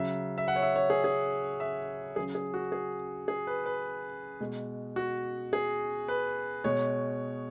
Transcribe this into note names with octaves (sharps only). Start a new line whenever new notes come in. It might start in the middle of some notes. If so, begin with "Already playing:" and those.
Already playing: C#3 F#3 E5
E5
F#5
C#5
E5
C#5
G#4
G#4
E5
C#3 F#3 G#4
G#4
F#4
G#4
G#4
B4
B4
B2 G#3
F#4
G#4
B4
B2 G#3 C#5